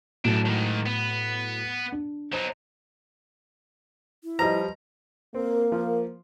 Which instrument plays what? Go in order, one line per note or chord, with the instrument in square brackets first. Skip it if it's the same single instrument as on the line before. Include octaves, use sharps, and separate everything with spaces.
[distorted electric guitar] F#2 D4 [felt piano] A2 F#3
[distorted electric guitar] G#2 D#3
B3
[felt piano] D4
[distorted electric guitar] F#3 D#4 [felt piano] C5
[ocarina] E4
[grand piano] F3 G3 [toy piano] B4 D#5 [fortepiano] A#5
[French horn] A#3 [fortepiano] C4 [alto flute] A#4
[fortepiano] F3